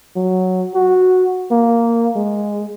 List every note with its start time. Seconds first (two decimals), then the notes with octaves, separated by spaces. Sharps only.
0.16 F#3
0.75 F#4
1.51 A#3
2.16 G#3